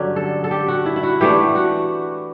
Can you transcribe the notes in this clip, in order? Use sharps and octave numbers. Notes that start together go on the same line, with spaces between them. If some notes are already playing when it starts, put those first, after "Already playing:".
Already playing: G2 D3 F#3 C#4 G4
A4
A4
G4
F#4
E4
E4
F#4
E3 A3 D4 G4
F#4